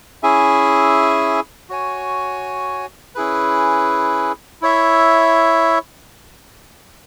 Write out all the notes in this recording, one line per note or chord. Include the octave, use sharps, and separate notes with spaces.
C#4 E4 G#4 E5 G#5
F#4 C#5 G#5
C#4 E4 G#4 B4
E4 C#5 E5